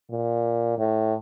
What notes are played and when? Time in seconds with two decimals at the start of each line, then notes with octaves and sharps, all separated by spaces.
0.11 A#2
0.79 A2